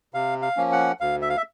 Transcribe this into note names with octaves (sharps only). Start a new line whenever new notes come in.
C3 F5
F5
F3 A#3 C#4
F#5
D2 F5
E5
F5
E5